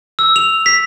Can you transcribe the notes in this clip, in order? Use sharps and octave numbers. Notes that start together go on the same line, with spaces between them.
E6
F7
B6